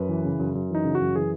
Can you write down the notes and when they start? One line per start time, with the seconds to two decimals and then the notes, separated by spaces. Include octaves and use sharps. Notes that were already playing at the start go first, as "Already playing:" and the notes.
Already playing: F#2 B4
0.09 E3
0.25 C#3
0.39 F#2
0.55 F#2
0.70 E3 D#4
0.85 C#3
0.95 F#4
1.01 F#2
1.15 E3 G#4